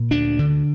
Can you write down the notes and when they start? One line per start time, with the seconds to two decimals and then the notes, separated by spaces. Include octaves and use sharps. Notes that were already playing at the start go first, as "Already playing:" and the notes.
Already playing: A#2
0.11 D2 D4
0.39 D3